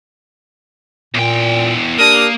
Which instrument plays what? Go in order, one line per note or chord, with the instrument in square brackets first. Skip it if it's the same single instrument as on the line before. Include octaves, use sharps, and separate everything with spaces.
[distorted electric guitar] E2 G5 [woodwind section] A#2
[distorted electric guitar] A#3 [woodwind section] D4 G4 A#4 [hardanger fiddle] D#6